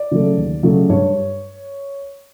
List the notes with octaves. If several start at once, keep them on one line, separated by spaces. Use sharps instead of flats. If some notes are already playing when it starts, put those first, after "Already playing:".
Already playing: D5
C#3 F#3 A3
D#2
C#3 F#3 A3
G2 C#5